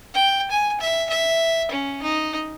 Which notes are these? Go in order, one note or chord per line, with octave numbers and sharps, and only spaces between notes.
G5
G#5
E5
E5
C#4
D#4